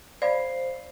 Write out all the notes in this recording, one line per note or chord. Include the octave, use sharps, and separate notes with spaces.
C5 D5 F5 B5